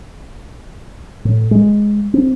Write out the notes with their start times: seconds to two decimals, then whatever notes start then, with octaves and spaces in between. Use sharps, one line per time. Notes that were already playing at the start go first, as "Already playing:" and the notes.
1.25 A2
1.51 G#3
2.14 C4